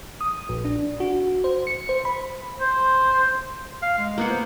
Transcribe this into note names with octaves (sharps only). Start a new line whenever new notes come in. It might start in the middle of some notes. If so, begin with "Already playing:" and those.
D#6
A#1
D4
F#4
C5
C#7
C5
B5
C5
F5
G#3
A#3 B3 F#5
C5